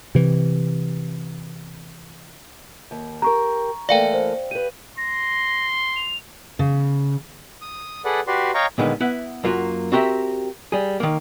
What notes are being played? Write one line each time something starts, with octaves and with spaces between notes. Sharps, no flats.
C3 E3
D#2
G4 A#4 A#5 C#6
E3 A3 A#3 D5 F5 G5
C5
G4 B4 D#7
C6 A#6
F7
C#3
D#6
G#4 A4 B4 D5 F#5
F#4 G4 B4 D5 C6
C#5 D#5 F5 G5 A#5 C#6
A#2 D3 D#3 G#3 B3
B3 E4 E5 F#5
F#2 A#3 F4 F#4
C4 F#4 G4 A#4 E5
G3 G#4
D#3 A#3